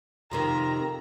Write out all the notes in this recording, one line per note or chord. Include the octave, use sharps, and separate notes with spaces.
F2 C3 D#3 A#5